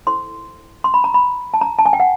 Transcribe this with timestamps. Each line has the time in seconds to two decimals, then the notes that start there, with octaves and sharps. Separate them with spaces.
0.07 E4 A4 C5 C6
0.84 C6
0.94 B5
1.04 A#5
1.14 B5
1.54 A5
1.61 A#5
1.79 A5
1.86 G#5
1.93 G5
2.00 F#5